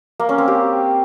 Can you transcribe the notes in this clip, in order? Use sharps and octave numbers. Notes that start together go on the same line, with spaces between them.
A#3
C#4
C4
G4